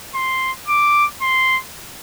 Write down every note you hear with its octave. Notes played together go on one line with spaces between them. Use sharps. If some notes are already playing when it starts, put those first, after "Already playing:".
C6
D6
C6